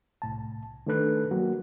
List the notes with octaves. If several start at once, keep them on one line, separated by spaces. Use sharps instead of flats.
C2 A2 A5
D#3 A3 D4 A4 B4 F#6
F#3 A#3 F#4